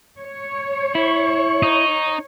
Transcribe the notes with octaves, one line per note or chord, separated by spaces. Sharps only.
C#5
E4 C#6
D#4